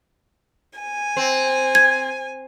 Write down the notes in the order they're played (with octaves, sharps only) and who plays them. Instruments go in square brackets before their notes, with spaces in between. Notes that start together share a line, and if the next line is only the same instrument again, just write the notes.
[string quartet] G#5
[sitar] C4
[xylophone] G#6